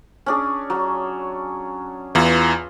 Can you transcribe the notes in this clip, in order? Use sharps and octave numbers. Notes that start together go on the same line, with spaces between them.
C#4 D4 G#4
F#3
E2 E3 F4